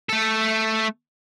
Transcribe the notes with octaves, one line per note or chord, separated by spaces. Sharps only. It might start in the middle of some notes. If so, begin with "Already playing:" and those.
A3 A4